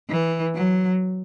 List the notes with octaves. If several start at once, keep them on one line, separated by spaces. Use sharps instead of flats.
E3
F#3